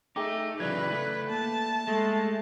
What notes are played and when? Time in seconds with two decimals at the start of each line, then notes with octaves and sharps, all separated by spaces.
0.16 A3 D#4 G#4 G5 D6
0.60 C#3 E3 F#3 B4 D5 G#6
0.91 A3
1.30 A#3 A5
1.87 G#3 A3